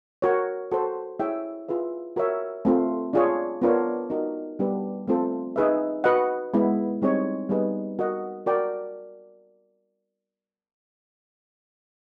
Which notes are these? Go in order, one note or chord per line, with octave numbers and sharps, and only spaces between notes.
F#4 A#4 C#5
F#4 A4 C5
E4 G#4 C#5 E5 G5
F4 G#4 B4 E5
F#4 A#4 C#5 E5
A3 C4 F4
D4 F4 G#4 C#5
B3 D4 F4 A#4 C#5
D#4 F#4 A#4
G3 B3 D4 G4 B4
A3 C4 F4 A4 C5
D#4 G#4 B4 E5
F#4 B4 D#5 F#5
G#3 B3 E4
G3 C4 D#4 G#4 C#5
G3 B3 D#4 G#4 B4
F#4 A#4 D#5 F#5
F#4 A#4 D5 G5